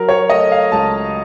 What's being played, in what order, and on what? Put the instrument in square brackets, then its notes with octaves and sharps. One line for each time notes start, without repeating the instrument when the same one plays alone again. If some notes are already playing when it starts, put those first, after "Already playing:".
Already playing: [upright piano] F#3 A#4
C#5
A3 D#5
F5
C#2 A5